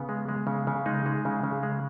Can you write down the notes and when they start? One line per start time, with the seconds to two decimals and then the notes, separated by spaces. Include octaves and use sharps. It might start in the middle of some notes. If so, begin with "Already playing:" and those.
Already playing: C#3 B3
0.09 G#3
0.29 G#3
0.47 C#3
0.67 C#3
0.86 G#3 D#4
1.06 G#3
1.25 C#3
1.43 C#3
1.63 G#3